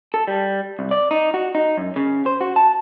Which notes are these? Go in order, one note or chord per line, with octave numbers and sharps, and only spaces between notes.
A4
G3
C2
D5
D#4
F#4
D#4
F#2
C#3
C5
F#4
A5